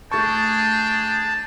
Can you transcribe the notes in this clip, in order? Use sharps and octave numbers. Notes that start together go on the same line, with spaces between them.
A3 D4 G#4 G5 A5 C#6